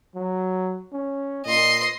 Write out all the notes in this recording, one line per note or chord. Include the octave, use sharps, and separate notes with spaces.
F#3
C#4
A#2 D#5 C6